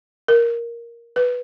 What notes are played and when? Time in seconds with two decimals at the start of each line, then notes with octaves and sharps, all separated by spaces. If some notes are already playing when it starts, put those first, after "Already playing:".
0.28 A#4
1.16 B4